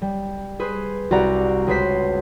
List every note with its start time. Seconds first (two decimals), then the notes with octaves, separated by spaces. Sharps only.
0.02 G3
0.59 G#4 B4 C5
1.11 C2 F#4 G4 D5 F#5 A#5
1.67 C#2 G#4 B4 C5 B6